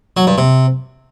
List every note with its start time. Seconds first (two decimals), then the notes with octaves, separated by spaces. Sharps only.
0.17 F#3
0.27 G2
0.38 C3